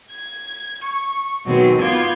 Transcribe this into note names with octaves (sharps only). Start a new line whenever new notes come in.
G#6
C#6
B2 D#3 F#3 G#3 C4
B3 F4 D6 G6 G#6